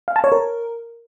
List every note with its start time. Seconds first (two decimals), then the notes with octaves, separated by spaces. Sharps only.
0.08 F5
0.16 A5
0.24 C#5
0.32 A#4